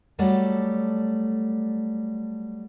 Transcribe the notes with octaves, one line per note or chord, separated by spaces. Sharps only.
F#3 G3 A3 A4 D5